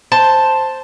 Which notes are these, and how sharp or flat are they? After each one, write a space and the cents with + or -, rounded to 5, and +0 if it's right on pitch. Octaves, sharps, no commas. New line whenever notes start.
C5 +0 A5 +0